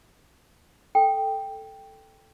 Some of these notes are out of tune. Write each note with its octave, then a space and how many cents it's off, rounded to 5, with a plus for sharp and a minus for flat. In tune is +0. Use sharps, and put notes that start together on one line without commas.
A4 +0 G5 +0